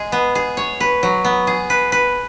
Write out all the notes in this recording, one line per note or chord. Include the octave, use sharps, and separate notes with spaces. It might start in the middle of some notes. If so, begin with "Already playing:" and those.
Already playing: G#3 G#4
B3
G#4
C#5
B4
F#3
B3
G#4
B4
B4